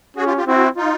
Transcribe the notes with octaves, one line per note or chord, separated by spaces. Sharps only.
C#4 F#4 G#4
F4 G4
F4 G4
C4 E4 F#4
D#4 F4